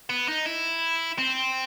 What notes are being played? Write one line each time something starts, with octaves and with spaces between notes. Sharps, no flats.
B3
D#4
E4
C4